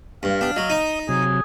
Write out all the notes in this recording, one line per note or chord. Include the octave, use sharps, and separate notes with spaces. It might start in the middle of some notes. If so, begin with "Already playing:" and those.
G2 F5
B3 D4 G4
F#3 D#5
D#4
C3 F#3 G#4